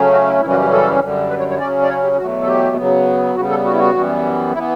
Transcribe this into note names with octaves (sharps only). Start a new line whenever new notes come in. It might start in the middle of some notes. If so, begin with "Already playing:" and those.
Already playing: C#3 F#3 A3 C#4
F#4
E4
F#2 C#3 E3 G3 C#4 E4
F#4
G4
A4
F#2 D3 G3
B4
C#5
C#5
C#3 F#3 C#4 D5
D5
C#5
G4
E2 B2 F#3 A3 F#4
A4
G4
C#3 F#3 B3
C#3 G3 B3 F#4
A4
F#4
E4
F#4
F#2 E3 G3 B3
E3 B3 E4